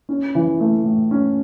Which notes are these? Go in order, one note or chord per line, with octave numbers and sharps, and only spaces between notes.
C#4
E3
A3
A2
C#4